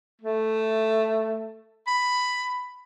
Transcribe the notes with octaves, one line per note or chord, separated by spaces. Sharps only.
A3
B5